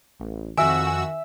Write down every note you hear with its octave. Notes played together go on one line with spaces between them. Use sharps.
A1
F2 D#3 F#4 E5 G#5 E6
G#5